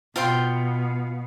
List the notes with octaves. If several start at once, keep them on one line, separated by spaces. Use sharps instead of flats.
B2 F4 G5 C6